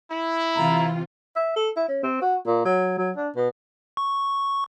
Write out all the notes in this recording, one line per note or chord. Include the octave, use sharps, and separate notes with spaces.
E4
C3 E3 F4 A#5
E5
A4
E4
C#4
C4
F#4
A#2
F#3
F#3
D4
B2
C#6